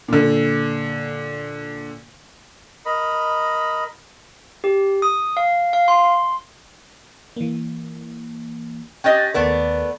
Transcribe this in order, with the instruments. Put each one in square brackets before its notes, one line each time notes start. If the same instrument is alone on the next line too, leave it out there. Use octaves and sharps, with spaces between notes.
[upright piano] A#2 D3
[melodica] A#4 D#5 B5
[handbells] G4
D#6
F5
F5
C6
[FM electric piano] E3 A#3
[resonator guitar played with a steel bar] C#4 G4 D#5 [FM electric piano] G5 F#6 A6
[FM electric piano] D#2 A#4 [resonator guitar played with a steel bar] A3 B3 D5